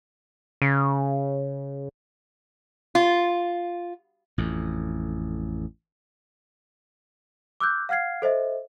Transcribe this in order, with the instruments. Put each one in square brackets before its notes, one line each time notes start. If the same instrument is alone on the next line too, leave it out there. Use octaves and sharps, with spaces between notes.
[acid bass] C#3
[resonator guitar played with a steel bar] F4
[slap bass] A1 F2
[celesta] D6 E6 F#6 G6
F5 F#5 F6 G#6 C7
A4 C5 D#5 E5